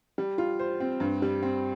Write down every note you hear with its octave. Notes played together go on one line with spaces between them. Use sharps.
G3
F4
C5
C4
G2
G3
C4